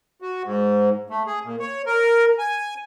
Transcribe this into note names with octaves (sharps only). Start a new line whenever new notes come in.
F#4
G#2
A3
G#4
A#2
C#5
A#4
G#5